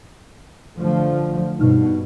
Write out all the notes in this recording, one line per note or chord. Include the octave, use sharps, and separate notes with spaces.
D3 F3 A3
G2 B2 D#4 F6